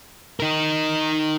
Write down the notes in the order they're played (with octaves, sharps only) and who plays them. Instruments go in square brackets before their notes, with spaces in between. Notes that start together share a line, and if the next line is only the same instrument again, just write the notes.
[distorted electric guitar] D#4 A#4